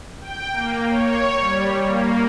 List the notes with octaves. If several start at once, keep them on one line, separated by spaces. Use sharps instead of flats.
G5
A#3
C#5
G3
A#3